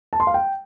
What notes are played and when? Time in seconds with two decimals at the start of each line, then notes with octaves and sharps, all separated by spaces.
0.13 A5
0.20 C6
0.27 F5
0.34 G5